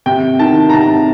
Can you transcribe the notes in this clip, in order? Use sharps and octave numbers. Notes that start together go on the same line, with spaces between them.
C3 G5
D#3 A5
A#5
C3 A5